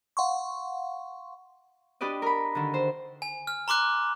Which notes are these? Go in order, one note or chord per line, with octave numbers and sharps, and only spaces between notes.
F5 F#5 C6 C#6
D4 G4 B4 D5 D#5
A#4 B5
D3 D#3
C5
G#5
F6
A#5 C6 D6 F#6